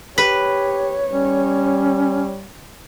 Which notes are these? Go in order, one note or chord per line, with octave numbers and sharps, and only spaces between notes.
G4 B4 C#5
G3 C#4